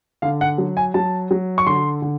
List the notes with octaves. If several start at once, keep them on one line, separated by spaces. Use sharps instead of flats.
D3 F5
F#5
F#3
G#5
F#3 A5
F#3
C#6
D3 C6
D3